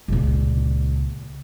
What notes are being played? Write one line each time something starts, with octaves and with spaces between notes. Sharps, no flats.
C#2 A#2